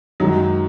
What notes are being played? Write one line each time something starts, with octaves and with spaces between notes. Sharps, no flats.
F#2 D#3 F#3 G#3 D#4